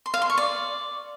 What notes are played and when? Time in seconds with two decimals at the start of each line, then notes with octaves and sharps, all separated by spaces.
0.06 C6
0.14 F5
0.22 C6
0.30 C#6
0.38 D5